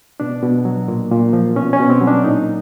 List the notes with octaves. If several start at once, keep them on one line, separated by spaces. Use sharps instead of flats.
B2 D4
B2
F#3
A#2
A#2
F3
B2 C#4
C#4
B2
C4
F#3
D4
A#2 D#4